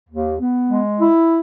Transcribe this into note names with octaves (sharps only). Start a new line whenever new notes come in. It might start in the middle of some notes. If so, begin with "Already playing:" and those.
D#2
B3
G#3
E4